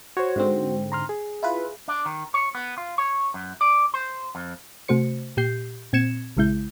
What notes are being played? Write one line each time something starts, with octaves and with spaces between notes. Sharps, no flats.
F#4 C5 C#5
G#2 D3 C4
A#5 C6 F6
G#4
E4 F4 B4
D4
D#3
C#5
B3
F4
C#5
F#2
D5
C5
F2
C3 A3 F#4 C5 C#7
A#2 G4 G6 C7
A#2 C4 G#6 C#7 E7
A#1 C#3 G#3 E4 G6